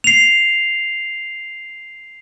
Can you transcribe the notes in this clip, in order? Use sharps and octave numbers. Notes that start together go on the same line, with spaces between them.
C7 F7